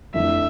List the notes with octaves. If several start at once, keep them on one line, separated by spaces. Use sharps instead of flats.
F2 D3 A3 E4 E5